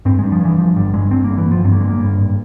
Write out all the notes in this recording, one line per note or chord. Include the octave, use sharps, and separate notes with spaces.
G2 C4
G#3
G2
F3
G2 E3
G2 F3
G1 G3
G2 G#3
G2 C4
A#3
G1
E3
G1 F3
G2 C4
A#3
G1 G#3
A#3
G2
G#1